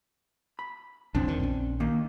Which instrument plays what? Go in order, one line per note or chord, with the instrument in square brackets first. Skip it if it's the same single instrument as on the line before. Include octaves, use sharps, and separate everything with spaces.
[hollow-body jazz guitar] B5
[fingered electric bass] B1 F2 C#3 [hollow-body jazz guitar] C4 D4
[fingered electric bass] E2 D#3
A#1 C#4
[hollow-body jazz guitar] D#3 A#3